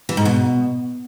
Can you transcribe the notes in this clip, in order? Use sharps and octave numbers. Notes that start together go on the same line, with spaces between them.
E3
G#2
B2